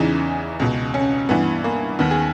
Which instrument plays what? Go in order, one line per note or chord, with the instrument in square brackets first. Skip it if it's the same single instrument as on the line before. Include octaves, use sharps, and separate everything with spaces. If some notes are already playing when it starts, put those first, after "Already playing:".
Already playing: [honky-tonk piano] E2 C#3 E3 D#4
C#2 B2
C#4
G2 E3 B3
A#3
D#2 D#3 B3
G#4